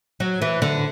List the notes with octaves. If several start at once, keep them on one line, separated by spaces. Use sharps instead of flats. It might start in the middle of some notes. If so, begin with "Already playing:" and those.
F#3
E3
D3